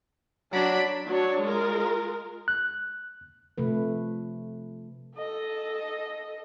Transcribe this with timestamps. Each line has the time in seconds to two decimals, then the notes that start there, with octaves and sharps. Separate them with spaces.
0.53 F#3 D4 B5
1.06 F#3 D4 C#5
1.42 G#3 F4 A#4
2.48 F#6
3.58 C3 F3 A3 B4
5.17 A4 D#5